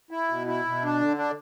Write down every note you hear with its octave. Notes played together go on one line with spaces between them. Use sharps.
E4
B2
E4
B2
D4
D3
D4